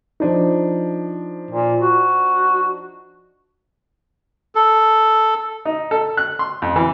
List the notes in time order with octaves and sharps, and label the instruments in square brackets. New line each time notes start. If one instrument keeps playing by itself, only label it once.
[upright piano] F3 D4 D#4
[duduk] A#2
F#4
[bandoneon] A4
[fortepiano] D#4
A4
F#6
C6
F2
E3